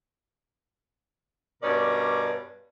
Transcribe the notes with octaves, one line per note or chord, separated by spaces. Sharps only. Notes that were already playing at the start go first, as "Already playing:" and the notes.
G2 B2 C#4 A#4 D5